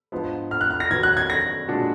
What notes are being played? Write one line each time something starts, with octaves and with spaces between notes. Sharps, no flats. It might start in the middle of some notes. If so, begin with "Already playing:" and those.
G#2 F3 B3 D4
F6
F#6
F6
A#6
D#3 F#3 B3 G#6
F#6
G#6
A#6
A#2 G#3 D4 F#4 D5